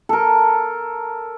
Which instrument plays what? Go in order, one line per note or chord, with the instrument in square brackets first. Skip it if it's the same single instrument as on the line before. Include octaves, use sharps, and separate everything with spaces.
[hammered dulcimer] A4 A#4